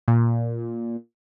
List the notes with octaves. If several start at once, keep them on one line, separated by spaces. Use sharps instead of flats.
A#2